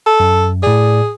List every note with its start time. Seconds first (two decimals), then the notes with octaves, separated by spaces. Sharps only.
0.07 A4
0.20 F#2
0.63 A2 G#4 D5